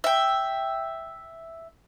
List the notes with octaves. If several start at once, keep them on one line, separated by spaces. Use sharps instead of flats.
E5 G5